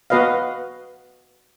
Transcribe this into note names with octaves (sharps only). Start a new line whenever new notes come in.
B3 F#4 B4 D#5 F5